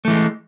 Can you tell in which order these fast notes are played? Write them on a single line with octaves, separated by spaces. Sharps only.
A3 E3 G#3